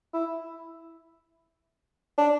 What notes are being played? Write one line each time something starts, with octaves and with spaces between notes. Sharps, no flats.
E4
D4